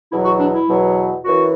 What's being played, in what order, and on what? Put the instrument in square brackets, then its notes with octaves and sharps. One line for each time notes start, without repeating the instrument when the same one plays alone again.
[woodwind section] E2 B2 F#3 E4
F#4
D4
E4
E2 B2 F#3
F#2 E3 F#4